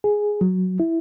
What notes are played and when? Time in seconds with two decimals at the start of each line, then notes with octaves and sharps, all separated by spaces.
0.04 G#4
0.41 F#3
0.80 E4